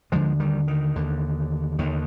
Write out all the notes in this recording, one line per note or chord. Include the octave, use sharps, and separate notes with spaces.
D#2 D3 F3 G#3
D#3 G3
D#3
D#2 D3
D#2 D3 D#3